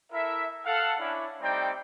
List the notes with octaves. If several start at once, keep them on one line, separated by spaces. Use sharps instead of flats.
E4 A4 A#4 E5
A4 F5 F#5
C#4 D4 E4
G3 A3 C4 D#4 D5 G5